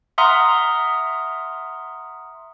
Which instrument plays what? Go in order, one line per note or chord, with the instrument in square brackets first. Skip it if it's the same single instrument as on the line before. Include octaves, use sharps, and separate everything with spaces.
[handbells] E5 F#5 A#5 C6 D#6 F6